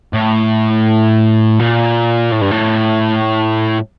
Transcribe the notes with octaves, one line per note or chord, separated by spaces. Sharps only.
A2
A#2
A2
G2
A2